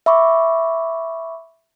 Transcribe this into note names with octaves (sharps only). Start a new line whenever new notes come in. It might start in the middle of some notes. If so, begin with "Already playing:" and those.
E5 B5 C#6 D6